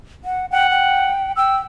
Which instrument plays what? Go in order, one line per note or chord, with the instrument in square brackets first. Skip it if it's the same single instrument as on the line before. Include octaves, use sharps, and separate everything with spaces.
[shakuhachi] F#5
[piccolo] F#5 [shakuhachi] G5
[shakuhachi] G5
[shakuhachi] G5 [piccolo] E6